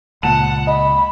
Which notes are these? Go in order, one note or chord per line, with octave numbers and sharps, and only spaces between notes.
C#2 A#2 F#5 A5 E7
D#5 B5